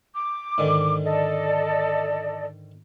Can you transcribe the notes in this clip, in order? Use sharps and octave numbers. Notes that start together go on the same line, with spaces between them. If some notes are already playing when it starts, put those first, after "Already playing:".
D6
G#2 D3 D#3
A4 D5 D#5